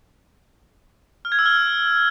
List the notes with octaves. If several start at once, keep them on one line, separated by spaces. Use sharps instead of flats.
F6
G#6
E6
F6